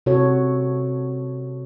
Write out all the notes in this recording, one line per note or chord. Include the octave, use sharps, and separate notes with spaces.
C3 F#4 A4 C#5